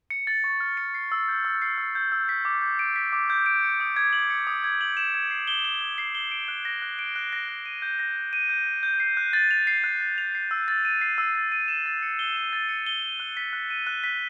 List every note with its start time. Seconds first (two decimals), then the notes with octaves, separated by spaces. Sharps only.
0.10 C#7
0.27 A6
0.44 C#6
0.60 F6
0.77 C#7
0.94 C7
1.12 E6
1.28 G6
1.45 E6
1.62 C7
1.78 E6
1.95 G6
2.12 E6
2.29 B6
2.45 D6
2.62 G6
2.79 D7
2.96 B6
3.13 D6
3.30 G6
3.46 D7
3.63 C#7
3.80 D#6
3.96 G#6
4.13 F#7
4.30 C#7
4.47 D#6
4.64 G#6
4.81 F#7
4.97 E7
5.14 G#6
5.31 C7
5.47 G7
5.65 E7
5.81 G#6
5.98 C7
6.15 G7
6.31 D7
6.48 F#6
6.65 A#6
6.82 F#6
6.99 D7
7.16 F#6
7.33 A#6
7.48 F#6
7.66 D#7
7.82 G6
7.99 A#6
8.16 G6
8.33 D#7
8.49 G6
8.67 A#6
8.83 G6
9.00 C7
9.17 F#6
9.33 A6
9.51 F7
9.67 C7
9.84 F#6
10.01 A6
10.18 F7
10.35 C7
10.51 E6
10.68 A6
10.85 D#7
11.01 C7
11.18 E6
11.35 A6
11.52 D#7
11.68 E7
11.86 A6
12.02 C#7
12.19 G7
12.36 E7
12.53 A6
12.69 C#7
12.86 G7
13.03 D#7
13.20 F#6
13.37 B6
13.53 F#6
13.70 D#7
13.87 F#6
14.04 B6